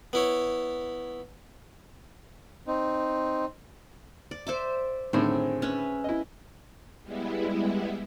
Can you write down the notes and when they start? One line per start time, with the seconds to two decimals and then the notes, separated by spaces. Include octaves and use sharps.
0.13 B3 E4 C#5
2.67 C4 D#4
4.31 D5
4.47 C5 E5 D6
5.13 A2 D3 D#3 C4 G#4
5.62 C#4 B4 E5
6.04 E4 D#5
7.03 G3 G#3 B3 E4